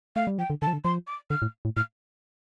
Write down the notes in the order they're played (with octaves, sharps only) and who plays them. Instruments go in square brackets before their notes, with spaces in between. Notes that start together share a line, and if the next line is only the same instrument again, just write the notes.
[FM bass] A3 [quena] F5
[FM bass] G3
[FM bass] F3 [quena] G5
[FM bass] D3
[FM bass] D3 [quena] A5
[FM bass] F3
D3
[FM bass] F3 [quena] C6
[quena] D6
[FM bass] D3 [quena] F6
[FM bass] A2
A2
[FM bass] A2 [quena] F6